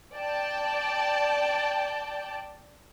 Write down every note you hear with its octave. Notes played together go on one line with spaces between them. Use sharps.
D5 G5 A5